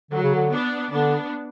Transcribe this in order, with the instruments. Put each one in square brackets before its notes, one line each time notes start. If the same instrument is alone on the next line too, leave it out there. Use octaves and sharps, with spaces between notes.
[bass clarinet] D3 [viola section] F#3
[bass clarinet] C#3
D3
[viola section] B3 D4
[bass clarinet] D3 [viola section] B3 D4